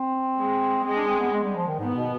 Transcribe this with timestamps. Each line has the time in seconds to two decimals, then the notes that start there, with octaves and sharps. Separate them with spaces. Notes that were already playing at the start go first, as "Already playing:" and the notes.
Already playing: C4
0.37 G#3
0.84 G#3 C4
0.96 D4
1.08 C4
1.20 B3
1.32 G#3
1.44 G3
1.56 F3
1.67 D#3
1.79 G#2 B3
1.95 B2